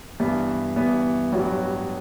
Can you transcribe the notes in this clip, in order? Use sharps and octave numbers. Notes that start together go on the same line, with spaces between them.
G2 E3 B3
G2 E3 B3
A1 G2 F#3 B3 F#4